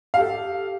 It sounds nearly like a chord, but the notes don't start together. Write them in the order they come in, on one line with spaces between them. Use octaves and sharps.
F5 G4 A4